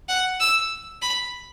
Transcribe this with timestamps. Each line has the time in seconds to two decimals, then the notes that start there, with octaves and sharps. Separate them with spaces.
0.09 F#5
0.40 E6
1.02 B5